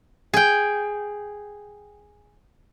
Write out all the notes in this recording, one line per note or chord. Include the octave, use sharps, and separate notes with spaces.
G#4 G5